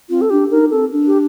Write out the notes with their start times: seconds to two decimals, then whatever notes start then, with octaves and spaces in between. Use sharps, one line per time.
0.10 C4 F4
0.21 A4
0.30 D4 G4
0.51 D#4 A#4
0.70 C4 A4
0.91 D4
1.07 G4